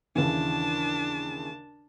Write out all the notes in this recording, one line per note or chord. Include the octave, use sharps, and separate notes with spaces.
D#2 C#3 E3 D4 A5